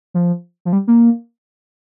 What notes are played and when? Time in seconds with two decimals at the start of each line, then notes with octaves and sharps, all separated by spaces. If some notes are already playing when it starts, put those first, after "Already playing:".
0.14 F3
0.65 F3
0.73 G3
0.87 A#3